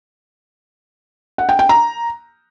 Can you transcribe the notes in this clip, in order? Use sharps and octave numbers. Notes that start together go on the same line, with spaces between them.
F#5
G5
G5
A#5